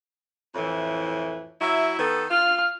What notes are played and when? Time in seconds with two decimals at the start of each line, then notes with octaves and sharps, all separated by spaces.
0.55 F2 A2 E3
1.61 F#3 E4 E5
1.99 D#3 B3 A4
2.30 F4 F6